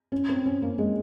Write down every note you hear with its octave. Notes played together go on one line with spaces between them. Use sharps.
C#4
C4
C#4
A#3
G#3